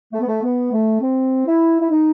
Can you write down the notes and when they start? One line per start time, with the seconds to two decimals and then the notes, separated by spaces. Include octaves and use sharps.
0.13 A3
0.20 B3
0.27 A3
0.43 B3
0.72 A3
1.01 C4
1.46 E4
1.80 E4
1.90 D#4